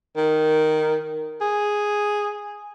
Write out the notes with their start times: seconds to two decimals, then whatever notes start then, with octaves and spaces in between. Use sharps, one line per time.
0.17 D#3
1.41 G#4